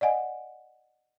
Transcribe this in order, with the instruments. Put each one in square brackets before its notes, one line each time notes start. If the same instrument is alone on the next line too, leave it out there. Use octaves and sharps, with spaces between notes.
[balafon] D5 D#5 F#5 G#5